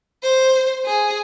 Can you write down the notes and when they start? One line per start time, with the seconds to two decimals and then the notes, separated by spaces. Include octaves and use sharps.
0.23 C5
0.86 G#4